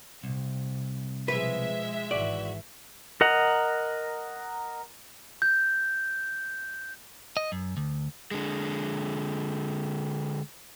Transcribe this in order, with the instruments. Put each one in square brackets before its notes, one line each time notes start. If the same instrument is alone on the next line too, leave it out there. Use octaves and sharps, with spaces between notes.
[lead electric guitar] C2 [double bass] C3
[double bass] B2 F3 [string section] G#3 E5 [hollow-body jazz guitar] B4
[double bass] G#1 E3 [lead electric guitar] F#4 [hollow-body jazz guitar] D5
[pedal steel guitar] A#4 D#5 F#5 A#5
[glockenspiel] G6
[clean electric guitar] D#5
F#2
D2
[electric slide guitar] D3 G#3